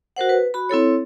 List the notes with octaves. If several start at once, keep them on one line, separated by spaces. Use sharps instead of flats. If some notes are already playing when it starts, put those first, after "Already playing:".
F#4 A#4 C5 F#5
B4
F#4 B5
C4 E4 A4 C#5